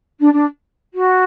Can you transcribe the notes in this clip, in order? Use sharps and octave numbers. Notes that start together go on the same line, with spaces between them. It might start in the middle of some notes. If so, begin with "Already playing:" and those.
D4
D4
F#4